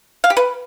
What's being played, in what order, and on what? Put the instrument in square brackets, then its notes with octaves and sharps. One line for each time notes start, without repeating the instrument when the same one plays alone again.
[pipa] F5
G4
B4